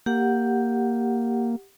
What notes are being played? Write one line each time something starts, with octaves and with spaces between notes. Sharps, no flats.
A#3 G4 F#5